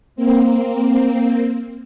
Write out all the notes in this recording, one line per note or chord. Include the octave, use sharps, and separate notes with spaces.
A#3 C4